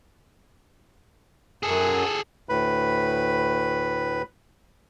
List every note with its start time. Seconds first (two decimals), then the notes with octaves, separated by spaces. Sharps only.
1.63 F#2 G#4 A4
2.49 D2 A2 B4 B5